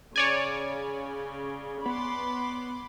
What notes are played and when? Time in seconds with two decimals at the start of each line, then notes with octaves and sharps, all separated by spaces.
0.16 C#3 C#5 D5 G#5
1.86 B3 B5 C6 D6